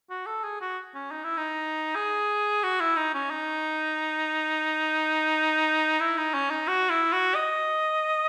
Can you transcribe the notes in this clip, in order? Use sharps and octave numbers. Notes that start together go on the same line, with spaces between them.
F#4
A4
G#4
F#4
C#4
D#4
E4
D#4
G#4
F#4
E4
D#4
C#4
D#4
E4
D#4
C#4
D#4
F#4
E4
F#4
D#5